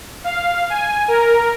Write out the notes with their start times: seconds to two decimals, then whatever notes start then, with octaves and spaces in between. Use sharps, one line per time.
0.24 F5
0.70 G#5
1.08 A#4